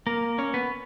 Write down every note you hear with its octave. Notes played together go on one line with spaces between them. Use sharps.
A#3 A#4
C#4 C#5
B3 B4